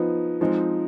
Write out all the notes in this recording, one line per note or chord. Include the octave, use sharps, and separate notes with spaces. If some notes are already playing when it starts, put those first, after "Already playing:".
Already playing: F3 B3 D#4
F3 G#3 C4 D#4